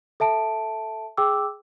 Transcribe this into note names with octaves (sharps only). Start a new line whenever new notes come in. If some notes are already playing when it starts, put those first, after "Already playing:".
A4 E5 A5 D7
G#4 G5 D6 E6